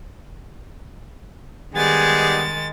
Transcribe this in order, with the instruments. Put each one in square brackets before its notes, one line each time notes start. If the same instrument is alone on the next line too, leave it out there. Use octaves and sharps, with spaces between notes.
[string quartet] D#3 G#3 A6 [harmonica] G3 B3 G#4